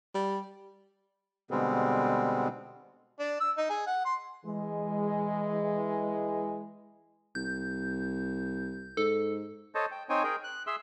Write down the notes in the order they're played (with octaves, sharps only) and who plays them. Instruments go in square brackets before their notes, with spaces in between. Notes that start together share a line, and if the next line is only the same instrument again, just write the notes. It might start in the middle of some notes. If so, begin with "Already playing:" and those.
[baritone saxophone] G3
[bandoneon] B2 D3 G3 G#3 B3 C4
[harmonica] D4
E6
D#4
G#4
F#5
C6
[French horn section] E3 G#3
[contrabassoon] C2 [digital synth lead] G6
[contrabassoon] G#2 [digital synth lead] A4
[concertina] A4 C5 C#5 D#5 A5
G5
C4 D#4 C5 C#5 G5 G#5
G#4 A#4 G5
F#6
G#4 E5 C6 E6